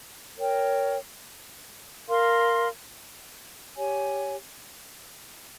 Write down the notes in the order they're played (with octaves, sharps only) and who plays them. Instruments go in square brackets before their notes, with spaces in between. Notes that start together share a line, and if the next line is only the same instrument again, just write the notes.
[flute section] A#4 C#5 G5
A#4 F5 C6
G4 C#5 G#5